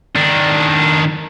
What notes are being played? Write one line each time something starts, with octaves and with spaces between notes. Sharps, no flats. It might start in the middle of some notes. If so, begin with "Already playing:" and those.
D#3 D4